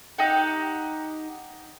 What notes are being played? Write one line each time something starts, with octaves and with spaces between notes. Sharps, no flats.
D#4 G4 F#5